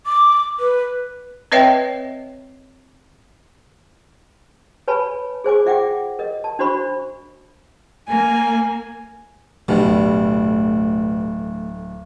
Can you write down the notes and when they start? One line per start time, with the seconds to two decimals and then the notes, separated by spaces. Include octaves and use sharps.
0.06 D6
0.59 B4
1.52 C4 B4 C#5 D#5 E5 G5
4.88 B4 C#5 G#5 A5 B5
5.44 G#4 C5 G#5 D6
5.66 F4 E5 F#5 G5 D6
6.19 A#4 D#5
6.44 A5
6.59 D4 F#4 C5 B5 C#6
8.08 A#3 G#5
9.68 D1 B2 G3 A3